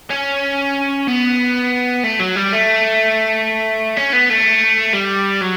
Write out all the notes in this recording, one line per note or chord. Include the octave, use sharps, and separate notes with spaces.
C#4
B3
A3
F#3
G3
A3
C#4
B3
A3
G3
F#3